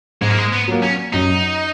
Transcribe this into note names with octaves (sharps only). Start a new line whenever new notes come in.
G#2 G#3
A#3
G#3
B3
F#3 A#3
C#4
F#2 D#4